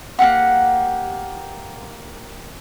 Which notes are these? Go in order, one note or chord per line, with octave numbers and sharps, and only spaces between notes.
A#3 C4 G4 F#5